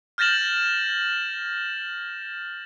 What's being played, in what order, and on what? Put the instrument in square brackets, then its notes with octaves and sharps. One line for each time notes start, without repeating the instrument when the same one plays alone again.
[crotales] F6 G6 A6 A#6 E7 F#7